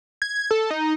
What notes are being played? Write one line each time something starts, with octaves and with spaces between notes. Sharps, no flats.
G#6
A4
D#4